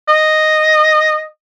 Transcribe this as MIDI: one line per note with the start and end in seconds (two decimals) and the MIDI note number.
0.08 1.24 75